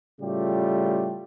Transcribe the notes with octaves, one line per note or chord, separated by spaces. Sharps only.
A2 C#3 G3 A3 F4 G4